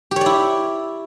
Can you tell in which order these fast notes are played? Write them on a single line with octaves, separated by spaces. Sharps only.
G4 C#5 D5 E4